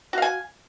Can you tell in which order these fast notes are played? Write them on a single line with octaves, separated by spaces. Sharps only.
F#4 F5 G#5